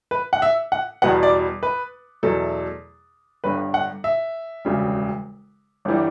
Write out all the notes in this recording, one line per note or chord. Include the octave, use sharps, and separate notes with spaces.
B4
F#5
E5
F#5
E2 B2 G3 B3 F#5
D5
B4
E2 B2 F#3 A3 A4
G1 G2 D3 B4
F#5
E5
E1 D2 C#3 G3
G1 E3 G3